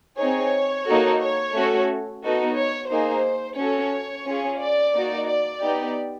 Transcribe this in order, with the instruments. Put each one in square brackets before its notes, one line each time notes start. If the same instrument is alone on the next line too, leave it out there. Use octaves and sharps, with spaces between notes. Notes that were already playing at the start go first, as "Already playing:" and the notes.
[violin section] C4 D#4 G#4 C#5
A#3 D#4 F#4 A4
C#5
A3 C#4 F#4 A4
B3 D#4 F#4 A4
C#5
A#3 D#4 G#4 C5
C#4 F#4 A4 C#5
C#4 F4 G#4
D5
A#3 D#4 F#4
D5
B3 D#4 G4